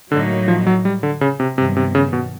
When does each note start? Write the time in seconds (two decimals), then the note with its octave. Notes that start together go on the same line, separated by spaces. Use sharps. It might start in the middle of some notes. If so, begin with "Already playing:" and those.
0.12 A2 D3 F#3 A#3 D#4 F#4
0.48 F3
0.67 F#3
0.85 G3
1.03 D3
1.21 C#3
1.40 C3
1.58 G2 C3 D#3 F#3 B3
1.76 C3
1.95 C#3
2.13 B2